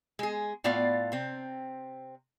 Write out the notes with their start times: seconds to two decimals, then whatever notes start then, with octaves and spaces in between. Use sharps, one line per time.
0.19 G#3 G#4
0.64 A2 B3 F4 D5 F5
1.12 C3 C4